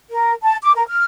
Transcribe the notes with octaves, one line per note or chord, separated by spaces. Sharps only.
A#4
A5
D6
A#4
F6